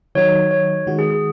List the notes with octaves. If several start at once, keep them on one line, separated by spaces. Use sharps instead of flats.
D#3 F#3 D#4 F#4 C#5
C#5
D#3 G#3 F#4
G#4
G#4